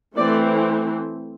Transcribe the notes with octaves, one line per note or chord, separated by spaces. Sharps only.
E3 A3 C4 D5